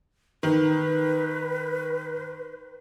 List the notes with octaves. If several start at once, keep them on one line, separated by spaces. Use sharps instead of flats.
D#3 B4